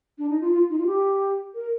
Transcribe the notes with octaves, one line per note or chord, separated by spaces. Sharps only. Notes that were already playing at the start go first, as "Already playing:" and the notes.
D4
D#4
F4
F4
D#4
F4
G4
A#4